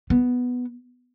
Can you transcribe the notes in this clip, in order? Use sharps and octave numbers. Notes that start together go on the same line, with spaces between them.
B3